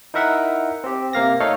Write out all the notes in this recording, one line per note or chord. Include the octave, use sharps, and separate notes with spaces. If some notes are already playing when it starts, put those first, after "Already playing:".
D#4 E4 A#4 E5 F#5
C4 G4
C3 A#3 F5 A#6
A3 D#4 A4 C#5 F5